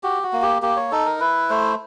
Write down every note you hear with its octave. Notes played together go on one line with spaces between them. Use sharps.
F#4 G4
F#4
A#3
G4
A#3 G4
C#5
D#4 A4
A#4
E4 B4
A3 C5